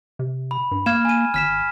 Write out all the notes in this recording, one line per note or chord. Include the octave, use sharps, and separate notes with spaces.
C3
B5
G2
A#3 F6 G#6 E7
G#5 D#7
G#1 F6 B6 E7